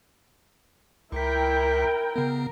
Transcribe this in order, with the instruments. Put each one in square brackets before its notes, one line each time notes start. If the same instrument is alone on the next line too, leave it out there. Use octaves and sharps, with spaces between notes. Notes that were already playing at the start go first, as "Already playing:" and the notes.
[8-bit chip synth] C#2 B6 [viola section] E4 A#4 G5
[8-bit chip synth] C#3 B3 [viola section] A#4